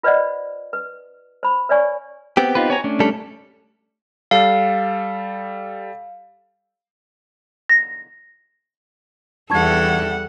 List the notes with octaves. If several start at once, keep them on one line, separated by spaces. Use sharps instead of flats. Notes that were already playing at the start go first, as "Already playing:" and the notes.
F4 B4 C5 D5 D#5 F#5
B4
C5 B5
B4 C#5 D5 G#5 C#6
B3 C4 G4
D#4 F4 B4
C#5 G#5 A#5
A3 C#4 D4
G3 A4
G3 A4 F5
A#6
E2 G3 A4 F#5 A5 C#6 G#6